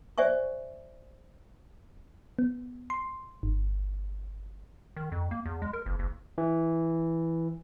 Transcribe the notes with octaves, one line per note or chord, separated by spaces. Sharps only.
C5 D5 E5 G#5 C#6
B3
C6
G1
D#3
F2
A#3
E2
G#3
A#4
F#1
F#1
E3